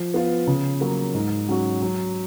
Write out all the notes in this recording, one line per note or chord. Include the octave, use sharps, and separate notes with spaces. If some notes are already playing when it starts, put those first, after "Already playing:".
Already playing: F3
B3 F4
C#3
F#3 A#3
G#2
F#3 C#4 F#4
F#3